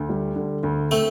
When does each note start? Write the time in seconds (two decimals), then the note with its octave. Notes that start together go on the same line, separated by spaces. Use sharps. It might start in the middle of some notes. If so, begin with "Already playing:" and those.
Already playing: D2
0.09 G3
0.36 D3
0.63 D2
0.91 A3 C4